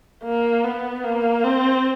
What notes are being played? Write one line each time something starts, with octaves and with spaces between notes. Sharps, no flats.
A#3
B3
A#3
C4